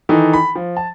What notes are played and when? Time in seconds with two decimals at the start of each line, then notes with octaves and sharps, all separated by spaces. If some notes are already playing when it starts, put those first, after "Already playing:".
0.09 D#3 E3 D#4 A4
0.33 B5
0.55 F3
0.77 A5